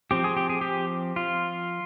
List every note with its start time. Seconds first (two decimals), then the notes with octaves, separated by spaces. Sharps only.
0.11 F3 C4 G4
0.24 G#4
0.37 G4
0.49 G#4
0.61 G4
1.16 F4